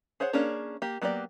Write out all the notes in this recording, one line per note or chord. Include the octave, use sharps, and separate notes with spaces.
G#4 C5 C#5 F#5
A#3 C#4 D4 G#4 C#5
A#3 G4
F#3 A#3 B3 G4 D5